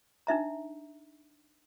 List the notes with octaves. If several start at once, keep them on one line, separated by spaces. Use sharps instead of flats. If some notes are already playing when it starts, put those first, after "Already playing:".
D4 D#4 E5 A#5